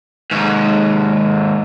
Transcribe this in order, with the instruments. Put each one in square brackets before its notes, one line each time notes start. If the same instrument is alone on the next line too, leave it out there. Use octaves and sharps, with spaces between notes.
[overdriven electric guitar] D#2 G#2